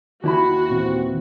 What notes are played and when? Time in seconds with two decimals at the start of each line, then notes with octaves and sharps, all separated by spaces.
0.24 D#2 E4 F#4 B5
0.70 A#2 E3 C4